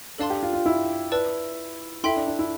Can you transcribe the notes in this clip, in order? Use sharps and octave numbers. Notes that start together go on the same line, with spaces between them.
D4 A4 D5 F5 A5 C6
G4
F4
F4
E4
B4 D5 A5 E6
E4 A4 E5 G5 C6
D4
D4
E4